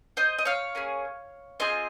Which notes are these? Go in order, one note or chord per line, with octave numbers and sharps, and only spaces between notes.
C5 D#5
D#5
C#5 F5
A#3 C#4 G#4
C4 F4 G#4 C5 D#5